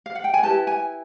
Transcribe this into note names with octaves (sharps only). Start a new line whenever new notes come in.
F5
F#5
G5
G#5
E4 G4 B4 A5
G#5